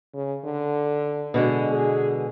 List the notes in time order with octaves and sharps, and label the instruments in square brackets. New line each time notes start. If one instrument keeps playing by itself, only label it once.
[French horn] C#3
D3
[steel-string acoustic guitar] B2 D3 G#3
[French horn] G#4